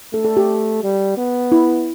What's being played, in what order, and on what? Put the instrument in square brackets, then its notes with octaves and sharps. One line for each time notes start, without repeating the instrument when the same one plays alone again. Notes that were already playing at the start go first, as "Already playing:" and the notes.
[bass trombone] A3 [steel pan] A4
[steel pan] A4
G4
[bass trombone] G3
B3
[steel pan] E4